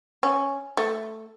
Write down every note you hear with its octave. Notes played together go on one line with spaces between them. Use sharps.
C#4
A3